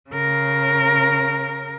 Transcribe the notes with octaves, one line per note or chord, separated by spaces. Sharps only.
C#3 A#4